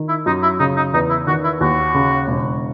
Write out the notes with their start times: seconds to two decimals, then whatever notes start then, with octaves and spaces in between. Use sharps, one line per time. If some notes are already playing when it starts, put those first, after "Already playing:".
Already playing: D#3
0.09 E4
0.26 F#2 D#4
0.43 E4
0.59 C#3 D#4
0.76 D#4
0.94 E2 D#4
1.10 E4
1.27 D#3 F#4
1.44 E4
1.61 D#2 F#4
1.94 C#3
2.27 E1